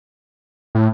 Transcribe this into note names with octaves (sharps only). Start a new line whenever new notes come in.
A2